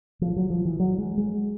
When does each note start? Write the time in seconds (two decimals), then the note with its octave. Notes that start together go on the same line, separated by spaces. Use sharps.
0.21 F3
0.36 F#3
0.50 F3
0.65 E3
0.80 F#3
0.98 G#3
1.18 G#3